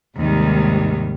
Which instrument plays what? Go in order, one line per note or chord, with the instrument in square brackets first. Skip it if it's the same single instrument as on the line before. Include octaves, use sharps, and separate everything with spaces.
[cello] D#2 D#3 [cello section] G#2 [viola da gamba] C3 G3